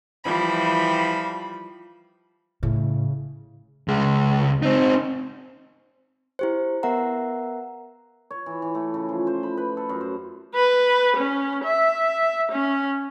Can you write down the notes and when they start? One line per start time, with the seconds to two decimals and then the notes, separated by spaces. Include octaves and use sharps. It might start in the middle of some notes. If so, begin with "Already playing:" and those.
0.24 E3 F3 G3 B5
2.63 A2 C#3
3.88 C#2 G#3
4.63 C4 D#4
6.39 E4 G4 C5
6.83 B3 A#4 E5 F#5 A#5
8.31 C#5
8.46 E3
8.62 E3
8.75 A3
8.94 C#3
9.09 F3
9.27 C5
9.43 B5
9.57 B4
9.77 A4
9.89 F#2
10.00 C5
10.55 B4
11.16 C#4
11.64 E5
12.52 C#4